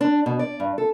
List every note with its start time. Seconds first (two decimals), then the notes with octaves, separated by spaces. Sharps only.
0.01 D4
0.26 B2
0.39 D5
0.60 G2
0.78 A4